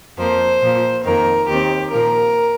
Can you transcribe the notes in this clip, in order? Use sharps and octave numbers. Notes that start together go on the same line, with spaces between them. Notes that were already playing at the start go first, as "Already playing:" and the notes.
F2 F3 A#3 C5
A#2 F3 A#3
F2 D#3 A#3 A#4
D#2 D#3 C4 G4
A#2 F3 A#3 A#4